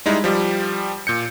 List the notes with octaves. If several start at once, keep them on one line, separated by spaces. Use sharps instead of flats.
G3 G#3 D#4 E4
F3 G3 G4
A#2 G6 C#7